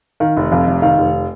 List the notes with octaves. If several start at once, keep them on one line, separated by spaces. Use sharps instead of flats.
D#3 F5
F1
F2 F5
F1
D#3 F5
F1